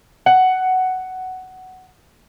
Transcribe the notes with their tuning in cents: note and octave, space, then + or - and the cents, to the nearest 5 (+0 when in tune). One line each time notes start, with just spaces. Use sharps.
F#5 +10